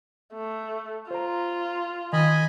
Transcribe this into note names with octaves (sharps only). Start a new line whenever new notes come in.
A3
F4 C5 A#5
D#3 D#5 G#5 B5